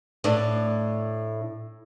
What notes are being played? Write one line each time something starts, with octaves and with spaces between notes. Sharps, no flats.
A2 D4